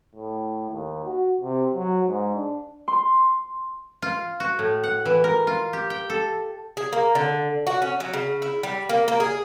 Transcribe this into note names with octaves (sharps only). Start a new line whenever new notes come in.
A2
D#2
F#4
C3
F#3
G#2
D4
C6
F4
F#4
A2
F#5
E3
A#4
F4
G4
G5
A4
G#4
A#3
D3
F#4
C#4
F#3
C#3
E4
G3
A#3
A#3
G#4